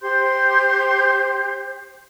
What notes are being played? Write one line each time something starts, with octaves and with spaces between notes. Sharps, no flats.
G4 C5 C6 G6